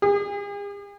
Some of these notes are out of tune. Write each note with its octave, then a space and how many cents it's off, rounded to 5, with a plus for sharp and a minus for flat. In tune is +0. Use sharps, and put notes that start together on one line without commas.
G#4 -45